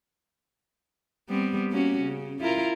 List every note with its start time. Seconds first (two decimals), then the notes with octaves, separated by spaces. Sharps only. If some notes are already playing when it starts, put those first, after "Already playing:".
1.29 G3 B3 C4
1.71 A#3 C#4 F#4
2.01 C#3
2.41 E4 F4 A#4